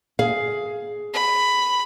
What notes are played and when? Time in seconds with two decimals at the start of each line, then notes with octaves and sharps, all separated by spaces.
0.19 G#4 F5
1.14 B5